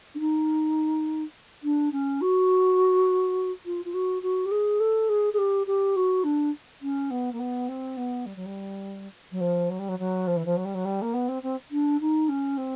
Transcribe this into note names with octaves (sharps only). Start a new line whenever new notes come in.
D4
D#4
D4
C#4
F#4
F4
F4
F#4
F#4
G4
G#4
A4
G#4
G#4
G4
G4
F#4
D4
C#4
B3
A#3
B3
C4
B3
G3
F#3
G3
F#3
F3
F#3
G3
F#3
F#3
F3
E3
F3
F#3
G3
F#3
G3
A#3
B3
C4
C4
D4
D#4
C#4
C4